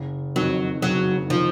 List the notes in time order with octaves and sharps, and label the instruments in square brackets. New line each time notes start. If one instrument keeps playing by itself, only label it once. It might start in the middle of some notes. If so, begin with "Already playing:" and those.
Already playing: [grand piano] F#1
[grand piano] F2 D#3 [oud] F#3
[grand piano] F#1 [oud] F#3
[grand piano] D#3 [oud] F3